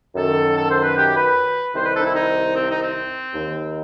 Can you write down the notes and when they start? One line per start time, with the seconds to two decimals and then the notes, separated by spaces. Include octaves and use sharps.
0.15 F#2 D#3 A4
0.56 A4
0.69 C5
0.82 B4
0.96 G4
1.16 B4
1.75 C2 C3 D#3 C5
1.85 B4
1.95 A4
2.00 D#4
2.04 E4
2.15 D#4
2.55 C4
2.68 D#4
2.82 C4
3.34 D#2 D#3